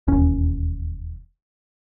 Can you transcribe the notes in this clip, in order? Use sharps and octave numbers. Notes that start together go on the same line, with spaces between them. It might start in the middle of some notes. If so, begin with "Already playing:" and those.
E1 D#2 C#4